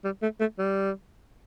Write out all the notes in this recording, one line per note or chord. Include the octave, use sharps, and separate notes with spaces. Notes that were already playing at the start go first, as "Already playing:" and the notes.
G3
A3
A3
G3